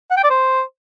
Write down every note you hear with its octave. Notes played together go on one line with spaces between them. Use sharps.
F#5
G5
D5
C5